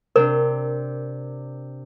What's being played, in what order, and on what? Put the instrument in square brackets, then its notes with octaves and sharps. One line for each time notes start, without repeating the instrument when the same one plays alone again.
[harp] C3 D4 [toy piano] A#4